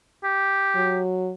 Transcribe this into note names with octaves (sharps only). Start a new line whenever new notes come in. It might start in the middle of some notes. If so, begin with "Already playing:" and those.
G4
F#3